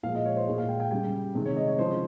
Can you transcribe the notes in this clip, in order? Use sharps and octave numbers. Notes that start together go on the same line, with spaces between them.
A#2 F3 G#3 F5
D#5
C#5
C5
A#2 G#3
F5
G5
G5
C#3 G3 G5
C3 D#3 G#3
C#5
D#5
C#5
C#3 F3 G#3 C5